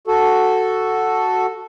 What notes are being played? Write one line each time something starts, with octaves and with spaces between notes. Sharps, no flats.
F#4 A4